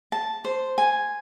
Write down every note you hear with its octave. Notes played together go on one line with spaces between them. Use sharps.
A5
C5
G#5